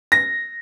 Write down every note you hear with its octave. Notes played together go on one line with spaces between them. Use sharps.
A#6